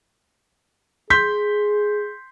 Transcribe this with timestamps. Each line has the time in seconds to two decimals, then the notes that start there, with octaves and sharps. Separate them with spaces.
1.10 G#4 C6 G6 B6